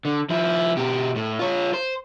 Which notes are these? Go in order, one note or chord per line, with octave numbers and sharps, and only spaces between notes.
D3
F3 E4
B2 G4
A2
F4 C#5
C5